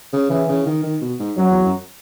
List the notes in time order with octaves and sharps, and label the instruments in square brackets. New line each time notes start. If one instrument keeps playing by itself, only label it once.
[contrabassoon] C#3
[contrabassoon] C#3 [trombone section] E3
[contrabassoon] C#3
D#3
D#3
B2
G#2
[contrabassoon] F#2 [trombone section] F#3
[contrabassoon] E2
F#2